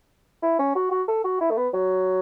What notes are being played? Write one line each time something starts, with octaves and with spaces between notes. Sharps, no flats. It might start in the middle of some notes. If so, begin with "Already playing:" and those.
E4
C#4
F#4
F#4
A4
F#4
E4
A3
B3
F#3